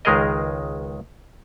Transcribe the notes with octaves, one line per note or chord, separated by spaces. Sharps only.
C#2 D#3 G#3 G#4 A#4 D#5